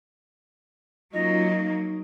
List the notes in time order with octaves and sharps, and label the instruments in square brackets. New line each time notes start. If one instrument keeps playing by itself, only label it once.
[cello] F#3 A#3 [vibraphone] C#4 D#4 F4 [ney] D#5
[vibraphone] D#4